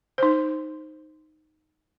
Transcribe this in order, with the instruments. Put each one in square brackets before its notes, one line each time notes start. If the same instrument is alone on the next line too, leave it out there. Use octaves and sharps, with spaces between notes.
[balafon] D#4 C5